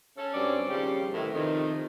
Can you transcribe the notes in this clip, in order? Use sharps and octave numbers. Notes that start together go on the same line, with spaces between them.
C#4 A4
G2 F#3 C4 C#4 D5
D#2 C#3 F3 G3 G4
A2 C3 D#3 E3 A3
F2 C3 D#3